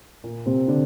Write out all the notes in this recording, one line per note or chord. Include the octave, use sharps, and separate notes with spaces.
A#2 A#3
C3 C4
D3 D4